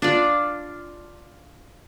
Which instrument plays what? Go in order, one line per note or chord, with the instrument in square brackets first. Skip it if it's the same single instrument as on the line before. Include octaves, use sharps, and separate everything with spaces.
[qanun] D4 F4 D5